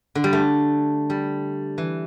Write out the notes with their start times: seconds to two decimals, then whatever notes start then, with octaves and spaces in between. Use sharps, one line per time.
0.15 D3
0.24 G3
0.33 A3
1.10 G3
1.78 E3